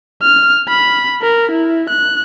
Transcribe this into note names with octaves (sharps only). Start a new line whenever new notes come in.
F6
B5
A#4
E4
F#6